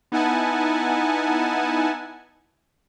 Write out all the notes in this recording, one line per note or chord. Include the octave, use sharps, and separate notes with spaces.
B3 D#4 E4 F#5 G#5 A5